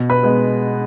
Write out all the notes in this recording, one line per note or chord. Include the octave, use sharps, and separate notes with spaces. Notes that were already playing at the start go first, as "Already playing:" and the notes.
Already playing: B2
B4 B5
G#3 B3